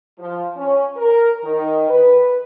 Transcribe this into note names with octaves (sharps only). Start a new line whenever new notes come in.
F3
C#4
A#4
D#3
B4